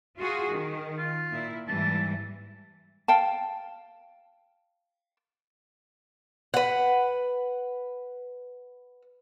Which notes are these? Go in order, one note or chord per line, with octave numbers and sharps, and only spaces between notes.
F4 F#4 G#4
D#3
F4
A#2 E4
G#2 E3 G3 A5
F5 G5 A5
B4 F#5